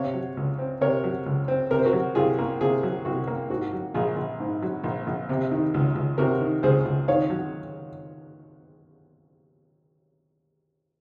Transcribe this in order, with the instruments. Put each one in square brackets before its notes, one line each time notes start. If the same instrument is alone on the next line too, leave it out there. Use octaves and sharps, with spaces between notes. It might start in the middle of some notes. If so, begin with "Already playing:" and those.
Already playing: [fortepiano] C3 C#5 F5
F#3
C#2
C4
C3 A#4 C#5
F#3
C#2
C4
C3 A#4
C5
F#4 A#4
F#3
C2 F4 G#4
A#3
C3 F4 G#4
F#3
C2 F#4
A#3
G#2 F#4
F#3
A#1 F4 G#4
A#1
G#2
F#3
A#1
A#1
C3
D#3
C#2
C#2
C3 F#4 A#4
D#3
C#2 G#4 C5
C#2
D#3 C#5 F5
F#3